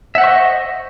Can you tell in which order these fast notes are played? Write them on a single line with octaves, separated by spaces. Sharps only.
E5 F#5 C5 C#6 D#5